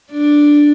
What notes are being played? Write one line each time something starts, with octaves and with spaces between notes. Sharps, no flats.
D4